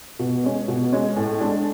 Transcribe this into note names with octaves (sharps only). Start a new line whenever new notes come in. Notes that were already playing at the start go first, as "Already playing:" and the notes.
B2
G#3 C#4
B2
G#3 C#4
A2
G#3 D4